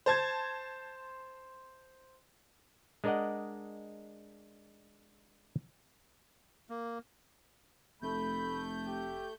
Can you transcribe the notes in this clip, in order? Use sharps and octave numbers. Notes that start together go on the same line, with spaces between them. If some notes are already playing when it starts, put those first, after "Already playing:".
C5 A5 G#6
G#3 D4 A#4 D5 D#5 F#5
A#3
F1 A3 B5 G6
G4